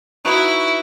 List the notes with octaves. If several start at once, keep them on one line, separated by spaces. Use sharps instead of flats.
D#4 E4 F#4 B4